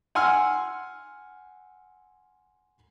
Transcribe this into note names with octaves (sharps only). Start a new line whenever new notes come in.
F#5 G#5 C6 E6 F6